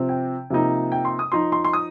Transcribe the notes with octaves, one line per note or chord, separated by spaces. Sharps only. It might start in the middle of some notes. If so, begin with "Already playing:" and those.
Already playing: C3 F3 C4
G5
C3 F3 A#3 D#4
G5
C6
D#6
F3 D#4 C6
C6
C6
D#6